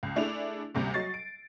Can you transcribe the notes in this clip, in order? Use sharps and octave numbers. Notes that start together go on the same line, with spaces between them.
C#2
A3 D4 E4 G#4 F7
D2 C3 G3
F#3 D#5 C#6 A6 C7
D7